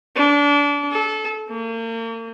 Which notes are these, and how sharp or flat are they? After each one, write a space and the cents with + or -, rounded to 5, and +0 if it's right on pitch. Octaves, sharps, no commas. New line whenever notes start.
D4 -30
A4 -25
A#3 -40